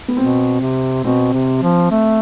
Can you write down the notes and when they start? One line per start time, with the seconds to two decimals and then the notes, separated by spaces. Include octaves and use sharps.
0.08 B3
0.17 B2 C4
0.61 C3
1.04 B2 C4
1.33 C3
1.62 F3
1.91 A3